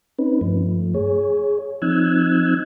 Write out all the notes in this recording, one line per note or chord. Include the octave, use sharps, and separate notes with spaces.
C4 C#4 D#4 B4
G2 F3 A3
G#4 C#5
F3 C4 D#4 E6 F#6 G#6